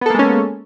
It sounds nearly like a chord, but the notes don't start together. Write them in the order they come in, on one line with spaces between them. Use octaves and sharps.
B3 A4 A#3 G#3 C#4